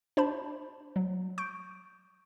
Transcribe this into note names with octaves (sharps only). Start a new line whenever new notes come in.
D4 C5 A5 B5
F#3
C#6 G6 D7